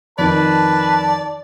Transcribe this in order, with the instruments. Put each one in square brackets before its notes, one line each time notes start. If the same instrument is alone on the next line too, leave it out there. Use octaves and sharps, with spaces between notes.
[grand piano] F2 D#3 [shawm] B4 [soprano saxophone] D5 [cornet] A5